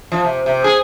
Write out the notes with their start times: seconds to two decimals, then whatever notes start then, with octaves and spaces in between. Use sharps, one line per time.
0.12 F3
0.25 C3
0.46 C3
0.64 G#4